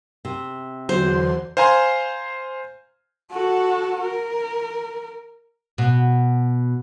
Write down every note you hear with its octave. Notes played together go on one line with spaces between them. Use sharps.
C3
E2 D3 F#3 C5 C6
C5 F5 G#5 A#5 C6
F#4 A4
A#4
B2